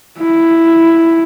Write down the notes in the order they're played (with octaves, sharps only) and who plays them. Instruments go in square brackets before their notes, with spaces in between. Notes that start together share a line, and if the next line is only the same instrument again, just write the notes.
[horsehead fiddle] E4